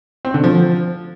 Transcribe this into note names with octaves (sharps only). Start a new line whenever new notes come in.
C4
D3
F3